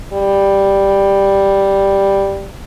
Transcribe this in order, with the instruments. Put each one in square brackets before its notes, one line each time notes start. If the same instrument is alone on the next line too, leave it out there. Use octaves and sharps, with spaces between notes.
[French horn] G3